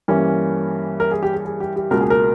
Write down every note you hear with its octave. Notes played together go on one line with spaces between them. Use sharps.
G2 E3 A#3 C#4
A#4
G#4
G4
G#4
G#4
G4
G4
C#2 B2 A#3 A#4
G#4
A#4